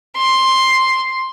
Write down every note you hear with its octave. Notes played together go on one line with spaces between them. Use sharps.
C6